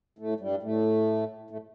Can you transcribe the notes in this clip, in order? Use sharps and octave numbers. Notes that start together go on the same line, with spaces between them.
A2 A3
G2 G3
A2 A3
A2 A3